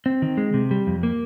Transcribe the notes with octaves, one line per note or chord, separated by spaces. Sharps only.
C4
D#3
G#3
C3
G3
F2
A#3